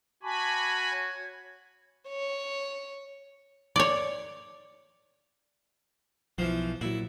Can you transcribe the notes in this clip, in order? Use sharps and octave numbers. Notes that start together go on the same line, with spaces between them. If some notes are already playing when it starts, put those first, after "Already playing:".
F#4 G#5 A5 B5 C#6 D6
C#5 G#6
C#5
C#5 D5
B1 E3 F3
A#2 F#3 E4